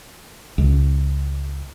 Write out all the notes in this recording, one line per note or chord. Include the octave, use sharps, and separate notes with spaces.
C#2